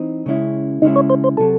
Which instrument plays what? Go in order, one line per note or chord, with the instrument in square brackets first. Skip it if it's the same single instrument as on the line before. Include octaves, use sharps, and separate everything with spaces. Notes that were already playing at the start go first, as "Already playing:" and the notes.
Already playing: [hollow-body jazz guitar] E3 C4 D#4
C#3 G#3 C#4 E4
[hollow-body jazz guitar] C#3 G#3 C#4 E4 [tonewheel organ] D#4
[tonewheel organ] C#5
C5
C5
[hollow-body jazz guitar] C3 F#3 [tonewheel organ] A4